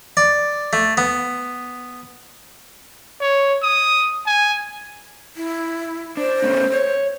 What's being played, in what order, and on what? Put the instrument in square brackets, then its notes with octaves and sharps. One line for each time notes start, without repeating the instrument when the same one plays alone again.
[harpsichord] D5
A3
B3
[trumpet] C#5
D#6
G#5
[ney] E4
[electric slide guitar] D4 [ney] C5
[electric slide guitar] A3 B3 C#4
C#5